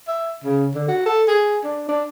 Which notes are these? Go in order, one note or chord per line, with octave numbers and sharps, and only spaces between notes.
E5
C#3
D3
F#4
A4
G#4
D4
D4